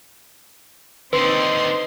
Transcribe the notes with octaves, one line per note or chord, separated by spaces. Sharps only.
D#2 D3 C4 D#4 B4 C6